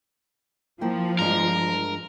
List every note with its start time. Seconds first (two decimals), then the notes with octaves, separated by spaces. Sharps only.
0.81 F3 A#3 E4 G5
1.19 G2 G#3 D4 A#4